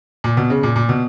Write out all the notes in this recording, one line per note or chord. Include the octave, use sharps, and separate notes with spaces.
A#2
B2
C#3
A#2
A#2
B2